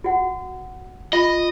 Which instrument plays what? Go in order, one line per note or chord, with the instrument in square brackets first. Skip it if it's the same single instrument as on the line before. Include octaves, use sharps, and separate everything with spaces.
[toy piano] F#4 F#5
[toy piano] F4 B5 [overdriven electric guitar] D#5